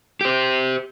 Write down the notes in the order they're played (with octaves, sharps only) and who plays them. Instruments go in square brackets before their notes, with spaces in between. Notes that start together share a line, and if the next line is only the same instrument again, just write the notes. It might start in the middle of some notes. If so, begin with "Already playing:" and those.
[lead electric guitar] G4 C5